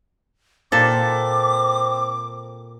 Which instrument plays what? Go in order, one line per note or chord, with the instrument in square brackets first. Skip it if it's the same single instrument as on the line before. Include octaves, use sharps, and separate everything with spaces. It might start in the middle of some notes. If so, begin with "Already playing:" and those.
[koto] A#2 A4 [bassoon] C4 [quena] D6